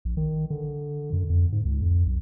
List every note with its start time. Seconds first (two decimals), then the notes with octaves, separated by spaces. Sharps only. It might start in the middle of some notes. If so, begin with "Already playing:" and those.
0.05 A#1
0.17 D#3
0.50 D3
1.13 F#2
1.30 F2
1.52 G#2
1.65 C#2
1.82 F2
2.06 B1